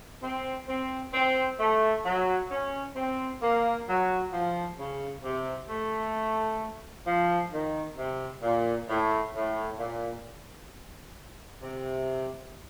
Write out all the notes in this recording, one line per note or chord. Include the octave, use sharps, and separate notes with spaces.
C4
C4
C4
A3
F#3
C#4
C4
A#3
F#3
F3
C#3
C3
A3
F3
D#3
C3
A#2
A2
A2
A#2
C3